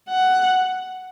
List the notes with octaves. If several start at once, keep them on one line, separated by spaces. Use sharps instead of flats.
F#5